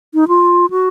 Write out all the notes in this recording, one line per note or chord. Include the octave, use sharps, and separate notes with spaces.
D#4
F4
F#4